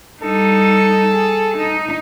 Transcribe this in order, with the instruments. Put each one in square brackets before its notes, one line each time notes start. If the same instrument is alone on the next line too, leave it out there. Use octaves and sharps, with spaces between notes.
[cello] G3 D#4 [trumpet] A4
[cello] G#4
D#4